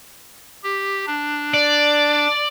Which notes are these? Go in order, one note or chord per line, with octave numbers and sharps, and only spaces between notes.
G4
D4
D5